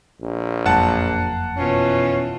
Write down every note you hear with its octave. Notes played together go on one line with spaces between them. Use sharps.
A#1
F#1 F2 F#3 A#3 F#5 A5
B2 E3 C#4 F4